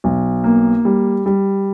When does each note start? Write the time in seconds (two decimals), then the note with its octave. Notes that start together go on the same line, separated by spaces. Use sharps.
0.04 B1
0.44 A#3
0.85 G3
1.26 G3